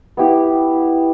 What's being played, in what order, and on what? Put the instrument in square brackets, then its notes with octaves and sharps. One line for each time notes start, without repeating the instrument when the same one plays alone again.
[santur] B3 E4 G4